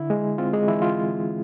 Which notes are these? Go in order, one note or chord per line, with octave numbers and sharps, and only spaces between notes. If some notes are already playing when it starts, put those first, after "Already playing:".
Already playing: D3 E4
G#3
C4 F4
G#3 G#4
E3 E4
F4